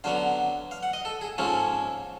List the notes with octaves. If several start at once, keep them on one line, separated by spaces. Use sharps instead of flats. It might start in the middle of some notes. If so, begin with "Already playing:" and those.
D3 F#3 B3 F5
F5
F#5
D#5
A4
G#4
G#2 F3 A#3 C#4 A4